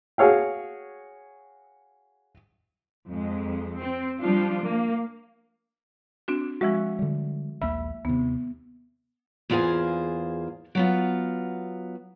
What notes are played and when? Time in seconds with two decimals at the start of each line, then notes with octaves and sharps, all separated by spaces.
0.18 F#4 G#4 C#5 F5 G5
3.09 F2 G#3
3.77 C4
4.20 F3 G3 D4 F4
4.62 A#3
6.28 C4 D4 F#4
6.61 F3 G#3 F#4 E5
6.99 D3 G3
7.62 A#1 D#2 A#3 E5 B5
8.05 D#2 C3 B3
9.50 E2 A#3 F4 G#4 C5 G#5
10.75 F#3 B3 F4